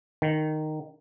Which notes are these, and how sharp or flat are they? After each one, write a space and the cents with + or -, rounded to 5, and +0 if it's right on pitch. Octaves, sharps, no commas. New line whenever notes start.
D#3 -10